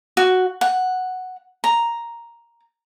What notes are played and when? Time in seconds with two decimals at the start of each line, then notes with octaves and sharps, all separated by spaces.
0.17 F#4
0.61 F#5
1.64 A#5